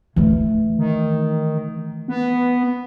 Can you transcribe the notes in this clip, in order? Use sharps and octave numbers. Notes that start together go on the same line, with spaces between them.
E3 A3
D#3
B3